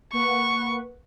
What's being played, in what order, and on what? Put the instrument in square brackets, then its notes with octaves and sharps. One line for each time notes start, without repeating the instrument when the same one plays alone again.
[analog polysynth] A#3 B4 F#5 [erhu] C#6